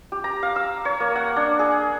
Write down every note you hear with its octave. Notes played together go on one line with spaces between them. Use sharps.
G4
A#5
F5
E6
C#5
A#3
F#5
D4
G#4